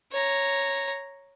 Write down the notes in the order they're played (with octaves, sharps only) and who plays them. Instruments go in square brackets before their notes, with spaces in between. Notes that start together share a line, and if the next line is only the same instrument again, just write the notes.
[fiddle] C#5 A#5